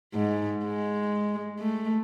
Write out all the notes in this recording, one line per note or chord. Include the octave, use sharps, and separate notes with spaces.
G#2
G#3
A3